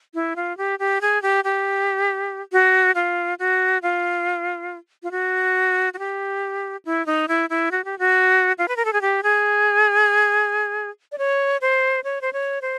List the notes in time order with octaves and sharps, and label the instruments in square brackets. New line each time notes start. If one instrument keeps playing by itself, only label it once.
[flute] E4
F4
G4
G4
G#4
G4
G4
F#4
F4
F#4
F4
F4
F#4
F#4
G4
E4
D#4
E4
E4
F#4
G4
F#4
F4
B4
A#4
A4
G#4
G4
G#4
D5
C#5
C5
C#5
C5
C#5
C5